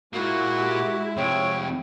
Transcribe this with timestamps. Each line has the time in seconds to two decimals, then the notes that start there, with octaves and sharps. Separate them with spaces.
0.13 A#2 G#3 A#3 E4 F#4
0.58 G4
1.17 F2 C3 C#5 G5